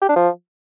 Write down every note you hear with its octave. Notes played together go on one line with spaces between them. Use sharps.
G4
D4
F3